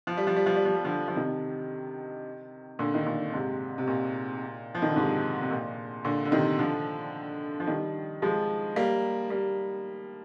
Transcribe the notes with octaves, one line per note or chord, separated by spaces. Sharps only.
F3
G3
F3
G3
F3
G3
F3
G3
D3 F3
F3
C3 D#3
A#2 D3
D#3
A#2 D3
G#2 C3
C3
A#2
F3
D#3
D3
G#2 C3
C3
A#2
A#2 D3
D3
C3 D#3
D3 F3
F3
D#3 G3
F3 G#3
G3 A#3
G3 A#3